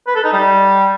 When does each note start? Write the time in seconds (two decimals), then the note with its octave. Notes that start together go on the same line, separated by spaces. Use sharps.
0.07 B4
0.15 A4
0.24 D#4
0.33 G3